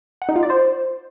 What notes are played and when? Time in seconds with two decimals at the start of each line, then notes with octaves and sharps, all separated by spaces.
0.22 F#5
0.29 D#4
0.36 F4
0.43 D5
0.50 C5